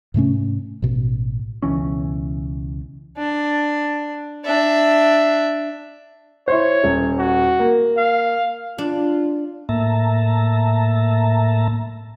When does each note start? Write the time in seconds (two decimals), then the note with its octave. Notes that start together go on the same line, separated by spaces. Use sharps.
0.14 G#2 C3 A3 C#4
0.82 A1 B2
1.63 C#2 B2 E3 C#4
3.18 D4
4.44 D4 E5
6.48 E4 C5 C#5
6.84 D#1
7.19 F#4
7.59 A#3
7.97 F5
8.78 D4 F4
9.69 A2 A#3 E5 A5 A#5